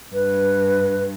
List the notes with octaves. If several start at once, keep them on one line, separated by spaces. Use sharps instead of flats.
G2 B4